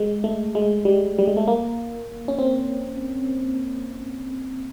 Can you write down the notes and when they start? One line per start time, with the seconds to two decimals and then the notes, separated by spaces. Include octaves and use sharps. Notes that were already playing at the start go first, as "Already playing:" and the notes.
Already playing: G#3
0.24 A3
0.55 G#3
0.85 G3
1.19 G3
1.27 G#3
1.37 A3
1.48 A#3
2.28 C#4
2.39 C4